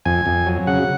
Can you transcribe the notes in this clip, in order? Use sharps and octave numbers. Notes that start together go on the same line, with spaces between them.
F2 G#5
F2
F#3
C#3 F#5